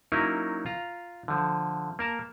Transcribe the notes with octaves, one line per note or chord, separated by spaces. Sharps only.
F#3 A#3 C#4 D#4 E4 A#4
F4 A#5
D3 F3
A#3 A#4 A5